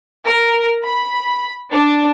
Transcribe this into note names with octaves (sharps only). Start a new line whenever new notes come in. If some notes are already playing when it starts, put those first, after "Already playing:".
A#4
B5
D4